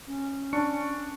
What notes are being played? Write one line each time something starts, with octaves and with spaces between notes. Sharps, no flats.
C#4
D4 C#6 C#7